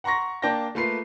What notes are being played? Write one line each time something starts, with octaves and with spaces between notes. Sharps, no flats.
F#5 A#5 C6 C#6 A#6
A#3 D4 G5 A5 G6 A#6
A3 A#3 F4 B4 F5 C7